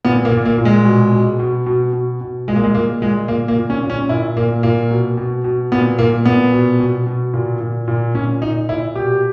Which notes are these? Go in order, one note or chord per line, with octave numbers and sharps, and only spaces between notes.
A#2 B3
A#3
A#2
A#3
A#2
G#3
B2
B2
B2
B2
B2
B2
A#2 G#3
A#3
G#3
A#2 A#3
A#2 G#3
A#2 A#3
A#3
A#2
C#4
A#2
C#4
A#2 E4
A#2 A#3
A#2 A#3
B2
B2
B2
A#2 B3
A#2 A#3
A#2 B3
B2
B2
B2
A#2
A#2
A#2
A#2 C#4
A#2 D#4
A#2 E4
B2 G4